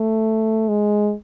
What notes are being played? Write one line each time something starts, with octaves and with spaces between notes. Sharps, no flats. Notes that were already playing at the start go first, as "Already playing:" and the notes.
Already playing: A3
G#3